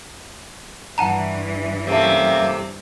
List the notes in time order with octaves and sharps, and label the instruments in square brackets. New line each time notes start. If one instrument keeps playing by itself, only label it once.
[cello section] G2 E3 [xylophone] F#5 A5 A#5
[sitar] C3 A3 [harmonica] A#3 C#4 E5